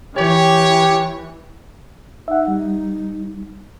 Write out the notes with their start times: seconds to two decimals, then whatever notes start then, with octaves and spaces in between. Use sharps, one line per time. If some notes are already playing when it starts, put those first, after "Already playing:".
0.15 E3 G4 C#5
2.28 D#4 E5 F#5
2.48 G3